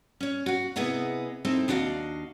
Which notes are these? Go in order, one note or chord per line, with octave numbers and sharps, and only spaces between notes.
C#4 C#5
F#4 F#5
C3 B3 E4 G#4 D#5 F#5
C4 D#4 E4 A4 C5
D#2 D4 F#4 D#5 F5